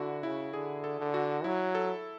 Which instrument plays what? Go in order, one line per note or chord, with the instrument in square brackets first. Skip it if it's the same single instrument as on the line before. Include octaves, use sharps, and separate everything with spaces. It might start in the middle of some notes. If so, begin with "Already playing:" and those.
Already playing: [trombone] D3 [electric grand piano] E4 F#4
[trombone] C#3 [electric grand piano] E4
[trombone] D3 [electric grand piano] G#4
[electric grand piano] A4
[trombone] D3
[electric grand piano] F#4
[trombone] F#3 [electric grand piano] E4
[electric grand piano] A4